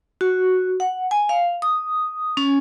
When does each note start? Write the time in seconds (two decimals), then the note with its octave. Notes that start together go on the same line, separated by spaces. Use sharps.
0.21 F#4
0.80 F#5
1.11 G#5
1.29 F5
1.62 D#6
2.37 C#4